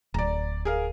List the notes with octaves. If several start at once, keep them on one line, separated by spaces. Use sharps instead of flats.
D1 D5 A#5
G#4 A#4 F5